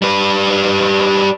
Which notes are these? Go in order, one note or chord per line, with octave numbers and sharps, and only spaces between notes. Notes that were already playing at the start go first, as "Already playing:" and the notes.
G3 B4